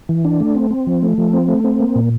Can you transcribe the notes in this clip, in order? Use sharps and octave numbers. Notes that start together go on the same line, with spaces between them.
E3
D4
A3
C4
C4
F3
A3
F3
C4
A3
C4
A#3
A#2